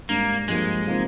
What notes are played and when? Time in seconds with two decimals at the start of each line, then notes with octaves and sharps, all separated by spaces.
0.09 G#2 G3 A#3 D4
0.48 G2 F3 G#3 A#3
0.87 C3 F3 A#3 D#4